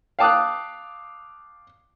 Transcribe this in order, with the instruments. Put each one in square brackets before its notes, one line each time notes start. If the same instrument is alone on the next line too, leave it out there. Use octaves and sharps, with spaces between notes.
[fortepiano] F5 G5 A5 D6 D#6 F#6